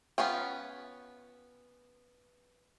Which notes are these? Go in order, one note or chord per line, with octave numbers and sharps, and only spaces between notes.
B3 C#4 F4 G5